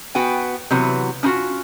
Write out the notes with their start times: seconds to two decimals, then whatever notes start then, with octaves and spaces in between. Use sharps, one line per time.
0.15 B3 F#4 G5 G#5
0.71 C3 E3 F#3 B3
1.23 C#4 D#4 F4 F#4